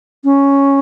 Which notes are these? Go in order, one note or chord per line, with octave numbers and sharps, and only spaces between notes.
C#4